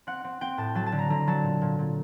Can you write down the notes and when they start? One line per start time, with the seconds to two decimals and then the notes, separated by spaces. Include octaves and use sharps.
0.07 C4 F#5
0.24 C4
0.41 C4 G5
0.58 A2 A5
0.75 F#3 A5
0.86 A5
0.92 D3
0.99 A#5
1.10 D3 A#5
1.27 F#3 A5
1.44 A#2
1.62 A#2
1.79 A#2